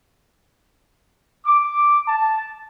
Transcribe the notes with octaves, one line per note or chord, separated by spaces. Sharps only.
D6
A5